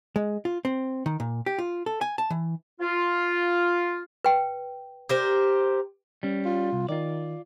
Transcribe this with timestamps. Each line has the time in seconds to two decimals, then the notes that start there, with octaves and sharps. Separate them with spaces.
0.16 G#3
0.45 F4
0.65 C4
1.06 D#3
1.20 A#2
1.46 G4
1.59 F4
1.86 A4
2.01 G#5
2.18 A5
2.30 E3
2.81 F4
4.25 B4 G5
5.09 G4 A#4 C5
6.23 G3 C#4
6.45 F4
6.73 C2
6.89 D#3 F4 D5